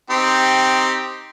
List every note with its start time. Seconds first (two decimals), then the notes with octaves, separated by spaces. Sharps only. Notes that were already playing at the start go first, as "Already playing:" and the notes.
0.10 C4 D#4 G4